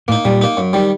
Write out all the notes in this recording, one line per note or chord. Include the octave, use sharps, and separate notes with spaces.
A2 A#3 D#4
A#2 G3
A#3 D#4
F#2
D#3 G3